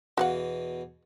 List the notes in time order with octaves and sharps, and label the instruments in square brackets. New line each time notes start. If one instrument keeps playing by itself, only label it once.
[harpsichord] E2 B2 [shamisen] F#4 F5 F#5